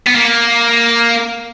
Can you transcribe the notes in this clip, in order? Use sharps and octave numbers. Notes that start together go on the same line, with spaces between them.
B3
A#3